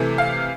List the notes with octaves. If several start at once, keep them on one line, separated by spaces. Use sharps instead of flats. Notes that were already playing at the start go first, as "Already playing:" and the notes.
Already playing: C3 E3 A3
F5